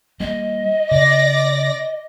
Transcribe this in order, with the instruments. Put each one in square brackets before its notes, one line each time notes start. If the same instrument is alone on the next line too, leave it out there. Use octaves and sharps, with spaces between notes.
[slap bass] G3 A#3 [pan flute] D#5
[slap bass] C#3 [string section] D5 A#6